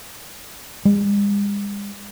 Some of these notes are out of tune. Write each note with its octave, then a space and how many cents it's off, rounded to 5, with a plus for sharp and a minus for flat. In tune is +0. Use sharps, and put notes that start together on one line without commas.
G#3 -45